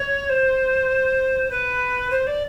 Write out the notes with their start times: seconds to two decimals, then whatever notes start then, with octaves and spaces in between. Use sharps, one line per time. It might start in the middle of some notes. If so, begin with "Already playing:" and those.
Already playing: C#5
0.29 C5
1.51 B4
2.11 C5
2.27 D5